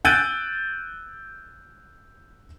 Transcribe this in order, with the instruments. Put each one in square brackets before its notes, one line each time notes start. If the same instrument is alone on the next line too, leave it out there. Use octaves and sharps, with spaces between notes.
[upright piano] E6 F#6 G6 A6 D7 D#7